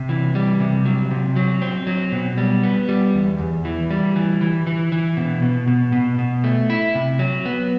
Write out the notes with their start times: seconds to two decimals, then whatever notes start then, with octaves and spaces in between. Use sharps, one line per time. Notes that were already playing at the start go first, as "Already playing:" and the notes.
Already playing: C3
0.09 E3
0.35 G3
0.60 C3
0.85 F#3
1.11 C3
1.36 F#3
1.62 C4
1.87 F#3
2.12 B2
2.38 G3
2.63 B3
2.89 G3
3.14 E2
3.39 E2
3.65 E3
3.91 G3
4.16 E3
4.41 E3
4.67 E3
4.92 E3
5.17 B2
5.42 B2
5.68 B2
5.92 B2
6.18 B2
6.44 A3
6.70 E4
6.95 C3
7.19 F#3
7.45 B3